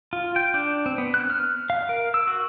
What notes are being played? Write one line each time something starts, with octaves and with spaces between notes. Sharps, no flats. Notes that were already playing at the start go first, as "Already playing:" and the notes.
F4
G5
D4
C4
B3
F#6
F6
F5
A#4
E6
F#4